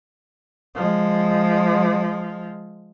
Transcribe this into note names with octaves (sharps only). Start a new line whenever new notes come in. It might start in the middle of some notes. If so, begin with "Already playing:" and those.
F3 G#3